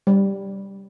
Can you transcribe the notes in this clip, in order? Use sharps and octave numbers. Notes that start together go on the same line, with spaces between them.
G3